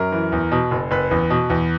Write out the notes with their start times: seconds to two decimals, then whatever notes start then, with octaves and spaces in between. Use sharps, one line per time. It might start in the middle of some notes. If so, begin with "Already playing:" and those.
Already playing: F#2 A#4
0.12 E3
0.32 E2
0.51 B2
0.71 F#1
0.91 F#1 B4
1.11 E2
1.30 B2
1.50 E2